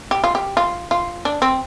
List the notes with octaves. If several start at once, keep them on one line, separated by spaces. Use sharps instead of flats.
G4
F4
G4
F4
F4
D4
C4